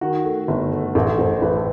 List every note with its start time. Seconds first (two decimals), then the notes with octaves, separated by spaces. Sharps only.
0.01 D#3 F#4
0.25 A3
0.48 G1
0.72 A3
0.95 A1 A4
1.19 A1 C5
1.42 A1 B4
1.57 A4